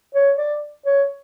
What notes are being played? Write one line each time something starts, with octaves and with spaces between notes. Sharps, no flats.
C#5
D5
C#5